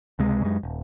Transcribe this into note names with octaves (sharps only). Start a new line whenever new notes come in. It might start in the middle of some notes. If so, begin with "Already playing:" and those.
C#2 C3 G#3
F#2 G#3
D#1